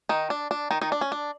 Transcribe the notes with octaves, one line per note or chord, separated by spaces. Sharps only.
D#3 D#4
D4
D4
D#3 D#4
D#3 D#4
D4
C#4
D4